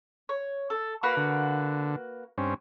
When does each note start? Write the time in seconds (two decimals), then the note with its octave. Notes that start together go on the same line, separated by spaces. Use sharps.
0.29 C#5
0.70 A4
1.03 A#3 F#4 B4 F5 B5
1.17 D3
2.38 G2 C4 C#4